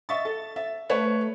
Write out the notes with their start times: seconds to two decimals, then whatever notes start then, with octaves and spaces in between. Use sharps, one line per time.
0.09 D#5 E5 C#6 A6
0.25 A4
0.56 E5
0.89 A3 B4 C#5